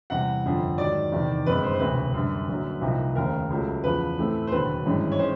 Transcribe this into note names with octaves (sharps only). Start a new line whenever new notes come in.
E2 C3 E3 G3 F#5
G1 F2 D3
G#2 D#3 F#3 D5
E2 C3 D#3
G1 F#2 D#3 G#3 C4 B4
C5
C5
E1 D2 C3 B4
F#2 D3 G3
F#1 F#2 D3 F#3
C2 C3 F3 A#3 D#4
F1 D#2 C#3 A#4
C#2 C#3 F#3 A3
E2 C#3 F3 B4
A2 E3 A3 C4
C5
E1 D#2 D3 F#3 B4
G#1 G2 E3 G#3 C#4
C#5
D#3 G#3 C#4 C5